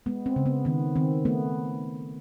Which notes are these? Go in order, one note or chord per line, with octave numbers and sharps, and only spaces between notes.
G#3 B3
C4
C#3
B3
D#3 B3
D#3 C4
A3 B3